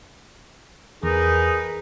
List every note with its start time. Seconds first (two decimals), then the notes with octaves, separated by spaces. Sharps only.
1.03 E2 D#4 G#4 A#4 B4